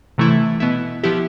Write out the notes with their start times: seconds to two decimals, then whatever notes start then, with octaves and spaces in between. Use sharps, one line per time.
0.18 C3 E3 A3 E4
0.60 B2 B3 E4
1.03 F3 B3 E4 G4